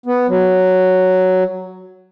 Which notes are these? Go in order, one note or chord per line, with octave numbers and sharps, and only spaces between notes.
B3
F#3